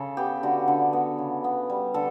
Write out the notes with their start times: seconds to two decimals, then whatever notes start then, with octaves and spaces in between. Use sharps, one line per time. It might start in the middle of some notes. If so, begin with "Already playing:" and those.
Already playing: C#3 A4
0.17 B3 G4
0.43 D3 F#4
0.68 D3
0.93 B3
1.18 C#3
1.44 B3
1.70 G3
1.94 D3 A4